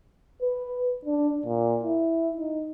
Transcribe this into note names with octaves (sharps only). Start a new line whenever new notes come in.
B4
D4
A#2
E4
D#4